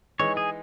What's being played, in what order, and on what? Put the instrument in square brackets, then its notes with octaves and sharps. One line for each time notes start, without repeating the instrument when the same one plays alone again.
[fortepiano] E3 G#3 D#4 [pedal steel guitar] C#5
[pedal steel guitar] G#4